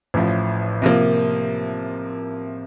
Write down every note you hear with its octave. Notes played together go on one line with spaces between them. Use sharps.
A1 A2 F3
C3 F3 A#3